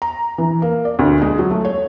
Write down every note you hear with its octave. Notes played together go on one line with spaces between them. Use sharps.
A#5
E3
A#3
D5
D2
G#3
F#3
A3
C#5